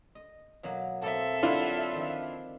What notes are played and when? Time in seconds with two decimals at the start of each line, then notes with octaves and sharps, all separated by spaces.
0.15 D#5
0.63 B2 F#3 A#3
1.02 B2 A#3 C4 A4 E5
1.43 D3 F#3 D4 E4 F4 C6
1.94 D#3 F3